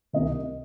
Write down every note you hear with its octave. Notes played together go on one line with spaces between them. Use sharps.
C2 C3 D#3 D#5